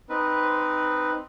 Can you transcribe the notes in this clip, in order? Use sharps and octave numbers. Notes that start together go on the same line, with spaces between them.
C4 D#4 B4